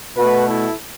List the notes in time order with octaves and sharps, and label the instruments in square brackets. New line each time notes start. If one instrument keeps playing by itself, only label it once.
[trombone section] B2 A3 F#4 B4
E4 A4